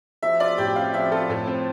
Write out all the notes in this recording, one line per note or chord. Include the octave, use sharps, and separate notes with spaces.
F3 E5
F4 D5
A2 G4
C4 F5
F3 E5
F4 A4
A2 A4
C4